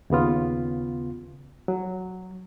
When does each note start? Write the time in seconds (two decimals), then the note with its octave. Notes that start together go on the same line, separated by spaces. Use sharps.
0.10 D#2 C#3 B3 F4
1.68 F#3